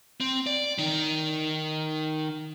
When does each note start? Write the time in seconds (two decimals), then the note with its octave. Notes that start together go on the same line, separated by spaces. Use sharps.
0.20 C4
0.46 D5
0.78 D#3 D#4